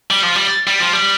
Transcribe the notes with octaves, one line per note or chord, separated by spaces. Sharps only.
G3
F3
G3
G3
F3
G3